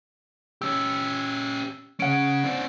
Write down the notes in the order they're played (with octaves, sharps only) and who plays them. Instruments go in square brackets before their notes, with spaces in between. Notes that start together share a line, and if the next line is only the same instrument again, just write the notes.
[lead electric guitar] C#4 G4 [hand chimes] E6
[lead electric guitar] C#3 C#4 [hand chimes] F#5 D7
[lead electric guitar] C4 D4